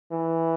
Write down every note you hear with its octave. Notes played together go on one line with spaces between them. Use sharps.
E3